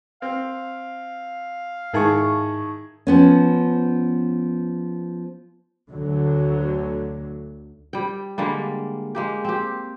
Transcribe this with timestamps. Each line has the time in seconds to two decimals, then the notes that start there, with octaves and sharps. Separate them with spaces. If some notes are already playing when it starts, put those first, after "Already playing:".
0.22 C4 F5
1.93 G#2 D#3 E4 G#4 A5 C#6
3.07 F3 B3 C#4
5.91 D2 D3 F#3
7.93 G3 G5
8.38 D3 G3 G#3 A#3
9.15 G#3 A#3 G4
9.45 C4 G4